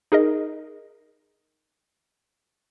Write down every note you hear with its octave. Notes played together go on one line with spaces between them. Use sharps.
D#4 G#4 A#4 D#5